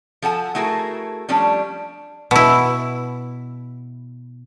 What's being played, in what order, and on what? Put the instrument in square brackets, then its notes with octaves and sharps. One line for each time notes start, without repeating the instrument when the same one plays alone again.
[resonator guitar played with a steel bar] F3 A4 F#5 G#5
A3 E4 F#4 G#4 A#4
F3 G3 A3 C#4 D4
[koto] B2 E4